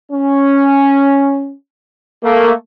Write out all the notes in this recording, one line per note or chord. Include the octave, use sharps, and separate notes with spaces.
C#4
A3 A#3